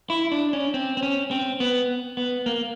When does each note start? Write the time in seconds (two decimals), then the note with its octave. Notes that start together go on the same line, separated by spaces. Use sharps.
0.10 E4
0.32 D4
0.53 C#4
0.74 C4
0.97 C4
1.03 C#4
1.31 C4
1.60 B3
2.17 B3
2.46 A#3